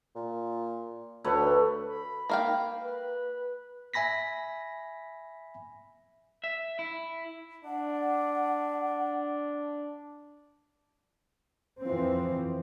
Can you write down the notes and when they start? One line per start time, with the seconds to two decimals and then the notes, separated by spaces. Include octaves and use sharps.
0.16 A#2
1.24 D2 A3 B4 C#5
1.87 B5
2.29 A#3 F5 G5
2.81 B4
3.94 E5 G#5 B5 A#6 B6
6.44 E5
6.79 E4
7.65 D4 F#5
11.83 F2 E3 F3 C4